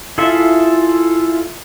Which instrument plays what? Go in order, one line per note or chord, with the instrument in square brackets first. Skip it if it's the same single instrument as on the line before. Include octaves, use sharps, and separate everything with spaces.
[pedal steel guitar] E4 F4 G#4 A4 E5